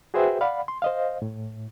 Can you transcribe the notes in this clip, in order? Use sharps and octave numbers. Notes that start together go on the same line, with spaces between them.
F#4 G#4 B4 C5 E5 G5
D5 F5 F#5 B5
C6
C5 D#5 F5
A2